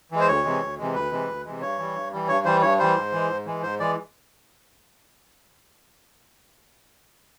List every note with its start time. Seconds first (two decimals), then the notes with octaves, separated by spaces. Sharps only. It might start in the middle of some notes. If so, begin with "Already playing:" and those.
0.11 E3 G#3
0.20 C5
0.28 D2 C#5
0.44 C3 E3 G#3
0.62 D2
0.78 C3 E3 G#3
0.94 D2 B4
1.11 C3 E3 G#3
1.28 D2
1.45 C3 E3 G#3
1.61 G2 C#5
1.79 E3 G3
1.95 G2
2.11 E3 G3
2.28 G2 C#5
2.45 E3 G3 C5
2.62 G2 C#5
2.79 E3 G3 C5
2.96 G#2
3.12 E3 G#3
3.29 G#2
3.46 E3 G#3
3.62 G#2 C5
3.79 E3 G#3 D5